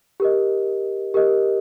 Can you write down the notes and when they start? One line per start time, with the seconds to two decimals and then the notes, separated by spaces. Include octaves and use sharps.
0.20 G4 A#4 D#5
1.14 G4 A#4 D#5